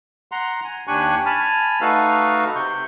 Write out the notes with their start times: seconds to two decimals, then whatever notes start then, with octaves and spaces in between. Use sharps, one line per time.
0.32 F#5 A#5 C6
0.64 G#5
0.87 D#2 D4 G4 G#5 C#6 F#6
1.26 G#5 A5 B5 F6
1.81 A3 D#4 F#4 A4 B4 F5
2.56 C3 C#6 G6